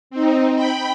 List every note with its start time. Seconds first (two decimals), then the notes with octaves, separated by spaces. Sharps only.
0.10 C4 D#4
0.55 G5 B5